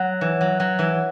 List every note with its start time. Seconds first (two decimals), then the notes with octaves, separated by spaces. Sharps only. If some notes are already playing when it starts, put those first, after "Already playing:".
Already playing: F#3
0.21 E3
0.41 F#3
0.60 F#3
0.79 E3